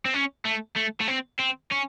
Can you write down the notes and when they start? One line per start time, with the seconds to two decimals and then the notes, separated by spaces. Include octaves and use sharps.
0.05 C4
0.14 C#4
0.45 A3
0.76 A3
1.00 A3
1.08 C4
1.39 C4
1.71 C#4